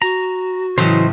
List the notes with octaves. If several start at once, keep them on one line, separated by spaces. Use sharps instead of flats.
F#4 A#5
A2 C#3 E3 F#3 C5 D#5